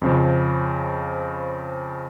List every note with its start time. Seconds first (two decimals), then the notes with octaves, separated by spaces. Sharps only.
0.02 F2 C#3 F3